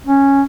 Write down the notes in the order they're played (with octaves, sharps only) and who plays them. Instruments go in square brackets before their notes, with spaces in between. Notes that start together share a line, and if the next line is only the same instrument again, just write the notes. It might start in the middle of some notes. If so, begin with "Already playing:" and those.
[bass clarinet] C#4